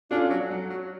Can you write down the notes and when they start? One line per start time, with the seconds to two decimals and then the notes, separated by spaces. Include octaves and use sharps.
0.11 C#4 D4 F4 A4
0.30 F#3
0.50 F#3
0.70 F#3